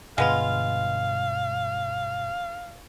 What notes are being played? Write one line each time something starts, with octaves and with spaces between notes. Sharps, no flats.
G2 B2 D3 G#3 B3 F4 F5